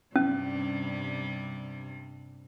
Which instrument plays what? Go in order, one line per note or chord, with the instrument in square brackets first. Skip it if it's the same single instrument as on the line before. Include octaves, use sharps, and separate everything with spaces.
[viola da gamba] G2 C3 G3 [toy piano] C#4